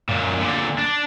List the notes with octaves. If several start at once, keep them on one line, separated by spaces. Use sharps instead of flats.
F#2 A#2
A#2 D3
D4